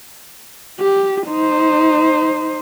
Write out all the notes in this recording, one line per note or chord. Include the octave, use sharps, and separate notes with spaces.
G4
D#4 C5